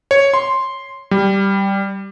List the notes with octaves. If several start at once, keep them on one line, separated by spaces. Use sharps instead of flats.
C#5
C6
G3